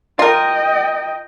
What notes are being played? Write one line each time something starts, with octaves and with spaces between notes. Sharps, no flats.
F4 A#4 D#5 G5